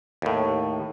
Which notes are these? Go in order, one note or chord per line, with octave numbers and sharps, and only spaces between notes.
D#2 A2